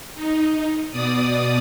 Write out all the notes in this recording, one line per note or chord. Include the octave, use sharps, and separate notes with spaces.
D#4
B2 D5 D#6